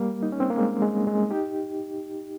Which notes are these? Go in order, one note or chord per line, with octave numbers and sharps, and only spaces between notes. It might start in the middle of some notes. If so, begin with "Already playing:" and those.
Already playing: G3 A#3
D#4
C#4
C4
A#3
G#3
G#3
G#3
D#4 G4